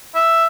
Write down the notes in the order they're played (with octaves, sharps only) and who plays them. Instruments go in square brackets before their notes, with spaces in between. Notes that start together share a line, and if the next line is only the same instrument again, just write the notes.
[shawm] E5